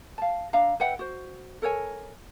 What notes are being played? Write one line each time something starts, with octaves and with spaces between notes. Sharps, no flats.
F5 A5
D4 E5 F5 A#5
B4 E5 F#5 G5
F#4 C5
A4 A#4 C#5 G#5